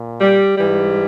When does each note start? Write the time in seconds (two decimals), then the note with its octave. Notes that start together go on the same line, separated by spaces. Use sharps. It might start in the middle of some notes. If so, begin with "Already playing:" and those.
Already playing: A#2
0.21 G3
0.58 G#2 E3 G3